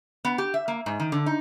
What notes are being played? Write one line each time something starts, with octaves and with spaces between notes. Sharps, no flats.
B3
G4
E5
A#3
G#2
D#3
D3
D#4